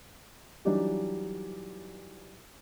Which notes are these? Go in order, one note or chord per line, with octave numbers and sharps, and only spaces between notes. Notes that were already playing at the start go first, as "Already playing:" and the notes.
E3 F#3 G3 D4 D#4 G4